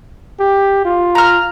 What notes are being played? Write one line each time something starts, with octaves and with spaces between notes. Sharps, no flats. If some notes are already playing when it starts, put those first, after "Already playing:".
G4
F4
A#5 F6